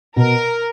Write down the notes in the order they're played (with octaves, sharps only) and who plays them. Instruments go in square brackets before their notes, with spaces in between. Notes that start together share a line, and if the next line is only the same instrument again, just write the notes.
[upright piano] B2 [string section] A#4